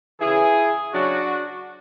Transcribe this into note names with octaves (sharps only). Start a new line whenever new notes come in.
C#3 E3 E4 G#4
C#3 F#3 D4 F#4